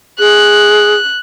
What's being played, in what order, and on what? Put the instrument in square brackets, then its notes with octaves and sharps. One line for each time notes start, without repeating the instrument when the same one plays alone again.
[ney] G#4 [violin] F#6